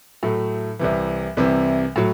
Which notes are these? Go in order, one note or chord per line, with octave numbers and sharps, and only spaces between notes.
A2 F#3 A3
C2 C3 E3
C2 C3 E3
A2 F#3